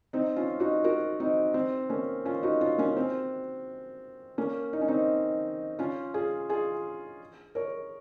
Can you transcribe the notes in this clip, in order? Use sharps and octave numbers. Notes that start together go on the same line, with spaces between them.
C4 D#4
C#4 F4
D#4 F#4
F#4 A#4
C4 D#4
C4
A#3 C#4
C#4 F4
D#4 F#4
C#4 F4
A#3 C#4
C4
A#3 C#4
D#4
C#4
C4 D#4
C#4 F4
F4 G#4
F4 G#4
A#4 C#5